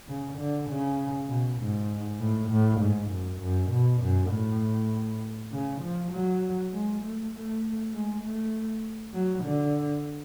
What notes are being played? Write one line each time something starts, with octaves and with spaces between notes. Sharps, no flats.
C#3
D3
C#3
B2
G#2
A2
A2
G#2
F#2
F#2
B2
F#2
A2
C#3
F3
F#3
G#3
A3
A3
G#3
A3
F#3
D3